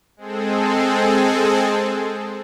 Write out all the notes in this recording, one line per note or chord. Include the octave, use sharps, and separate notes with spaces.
G#3 C4 G#4 A4